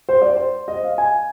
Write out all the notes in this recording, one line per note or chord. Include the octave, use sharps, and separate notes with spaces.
C5
D5
C5
D#5
F5
G#5